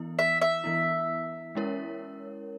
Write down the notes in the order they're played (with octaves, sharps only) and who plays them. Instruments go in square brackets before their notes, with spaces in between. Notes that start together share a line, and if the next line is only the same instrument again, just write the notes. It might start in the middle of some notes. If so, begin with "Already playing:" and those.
Already playing: [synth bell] E3 B3 E4
[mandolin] E5
E5
[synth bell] E3 B3 E4
G#3 C#4 E4 A#4 C#5